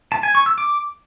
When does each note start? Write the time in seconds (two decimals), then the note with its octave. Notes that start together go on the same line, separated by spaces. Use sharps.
0.12 A5
0.23 G#5
0.35 C#6
0.46 E6
0.58 D6